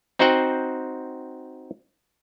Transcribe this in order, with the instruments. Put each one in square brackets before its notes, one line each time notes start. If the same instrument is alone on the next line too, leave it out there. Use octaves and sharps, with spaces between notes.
[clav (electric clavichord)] C4 D#4 F#4 C5 F#5 G5